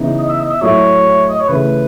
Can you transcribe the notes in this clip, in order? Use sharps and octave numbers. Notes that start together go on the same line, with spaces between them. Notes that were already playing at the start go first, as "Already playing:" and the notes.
Already playing: C#3 E3 B3 D#4
D#5
E5
D#5
E5
A2 F#3 A3 E4 C#5
D#5
C#5
C#3 E3 A3 B4